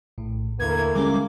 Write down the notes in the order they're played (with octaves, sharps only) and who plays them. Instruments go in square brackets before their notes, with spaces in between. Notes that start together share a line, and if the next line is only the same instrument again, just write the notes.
[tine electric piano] A#1 A2
[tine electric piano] D#2 D3 [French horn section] E3 A3 A#3 [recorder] G#6
[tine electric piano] D3 [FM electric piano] G3 G#3 C#4 [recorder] D6